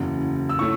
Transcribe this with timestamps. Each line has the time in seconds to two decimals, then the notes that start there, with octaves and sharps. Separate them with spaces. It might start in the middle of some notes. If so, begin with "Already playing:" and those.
Already playing: F#1 E2 C#3 F#3
0.49 E6
0.59 A2 A3 C#4 C#6